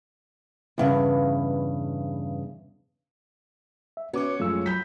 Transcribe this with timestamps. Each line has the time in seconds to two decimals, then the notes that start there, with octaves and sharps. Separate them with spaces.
0.78 E2 G2 C#3
3.97 E5
4.13 B3 C#4 F#4 C#5 D6
4.40 F#2 F3 G#3 A3 F4 E6
4.66 F#3 B5 G6 B6